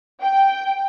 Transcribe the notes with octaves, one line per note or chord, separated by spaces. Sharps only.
G5